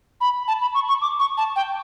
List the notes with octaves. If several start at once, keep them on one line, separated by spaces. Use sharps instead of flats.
B5
A5
B5
C#6
C#6
D6
C#6
A5
G5